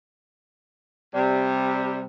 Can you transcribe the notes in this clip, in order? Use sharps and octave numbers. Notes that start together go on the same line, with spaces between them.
C3 G3